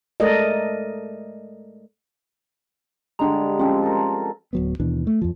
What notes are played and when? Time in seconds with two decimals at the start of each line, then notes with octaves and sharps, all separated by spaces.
0.20 G#3 A3 A4 A#4 D5 D#5
3.19 D3 G3 G#3 D4 A#5
3.59 F3 C4 C#4
3.83 A4 A#4
4.53 D1 F#3 B3
4.80 D#2 B2 E3 D4
5.07 A3
5.21 F2 F3